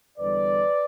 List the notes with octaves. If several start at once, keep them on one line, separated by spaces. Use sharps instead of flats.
E2 D3 G3 B4 D5